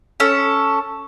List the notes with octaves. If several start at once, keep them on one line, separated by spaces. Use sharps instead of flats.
C#4 A4